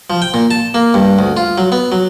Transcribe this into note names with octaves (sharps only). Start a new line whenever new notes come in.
F3
G5
A#2
A5
A#3
G2
D2
F4
F#3
B3
F#3